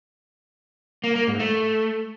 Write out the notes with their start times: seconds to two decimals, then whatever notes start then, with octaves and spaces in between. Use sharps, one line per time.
1.04 A#3
1.16 A#3
1.27 G#2
1.39 A3